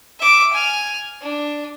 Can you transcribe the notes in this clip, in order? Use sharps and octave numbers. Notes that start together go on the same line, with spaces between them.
E5 D6
G#5 F6
D4